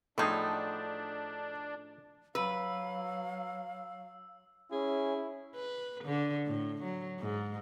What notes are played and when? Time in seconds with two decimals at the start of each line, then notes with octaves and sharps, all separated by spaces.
0.18 A2 F3 F#3 A3 D4 D#4 G#4
2.35 F#3 B4 F5 E6
4.72 C#4 E4 G#4
5.56 B4
6.05 D3
6.46 A2
6.83 F#3
7.19 G#2